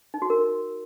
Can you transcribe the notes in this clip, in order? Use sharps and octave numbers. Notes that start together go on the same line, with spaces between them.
D#4
F#4
A#4